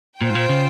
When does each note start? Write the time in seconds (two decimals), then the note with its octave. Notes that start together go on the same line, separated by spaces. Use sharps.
0.21 A#2 F4 C5 G5
0.30 G#2
0.35 A#2
0.49 C#3